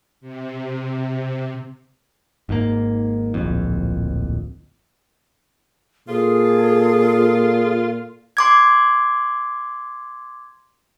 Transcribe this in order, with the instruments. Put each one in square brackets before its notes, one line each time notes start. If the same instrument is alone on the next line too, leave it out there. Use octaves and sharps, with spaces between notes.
[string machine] C3
[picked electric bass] G#1 G#2 C3 A#3
D1 A#1 F2
[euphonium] A#2 [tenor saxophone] F4 [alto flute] G#4 [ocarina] A4
[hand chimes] C6 D6 G#6